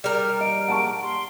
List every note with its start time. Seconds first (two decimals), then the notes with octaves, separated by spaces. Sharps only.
0.04 G3 A#4 F6
0.41 D#5 D7
0.68 F#5 A5 C#6
1.03 C6